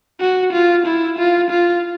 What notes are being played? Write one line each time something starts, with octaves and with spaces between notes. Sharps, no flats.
F#4
F4
E4
F4
F4